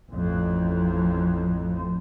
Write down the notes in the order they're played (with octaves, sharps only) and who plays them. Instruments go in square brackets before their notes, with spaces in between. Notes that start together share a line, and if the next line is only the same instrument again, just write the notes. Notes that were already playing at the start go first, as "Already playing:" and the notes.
[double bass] A1 F2